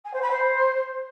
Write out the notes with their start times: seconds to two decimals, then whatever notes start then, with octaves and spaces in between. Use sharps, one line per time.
0.05 G#5
0.13 C5
0.22 B5
0.30 C5